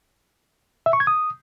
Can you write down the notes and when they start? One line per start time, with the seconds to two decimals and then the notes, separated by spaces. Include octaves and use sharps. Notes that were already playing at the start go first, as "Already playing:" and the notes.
0.86 E5
0.93 C#6
1.00 G#6
1.07 D#6